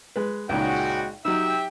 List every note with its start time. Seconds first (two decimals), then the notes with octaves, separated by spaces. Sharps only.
0.16 G#3 B4
0.49 C#2 A#2 G#3 C#4 D#4 F#4 G5
1.25 F#3 D#4 G4 E5 G5 E6